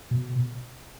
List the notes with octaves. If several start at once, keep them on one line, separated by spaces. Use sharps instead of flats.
B2